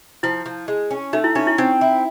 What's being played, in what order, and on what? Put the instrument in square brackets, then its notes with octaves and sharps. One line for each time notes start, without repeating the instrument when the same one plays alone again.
[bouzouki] F3 [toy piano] E4
[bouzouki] F3
G#3
C#4
[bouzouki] A3 [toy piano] D#4
[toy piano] E4
[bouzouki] C#4 [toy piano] D#4
[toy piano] E4
[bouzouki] C4 [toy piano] D#4
[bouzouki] E4